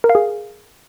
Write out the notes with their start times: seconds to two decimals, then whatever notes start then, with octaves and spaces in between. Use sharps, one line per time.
0.04 A#4
0.10 F5
0.15 G#4